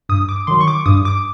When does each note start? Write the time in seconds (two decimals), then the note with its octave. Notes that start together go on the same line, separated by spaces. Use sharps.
0.09 G2 D#6
0.29 D6
0.47 D#3 F#3 C6
0.60 C#6
0.68 D6
0.86 G2 D#6
1.05 D6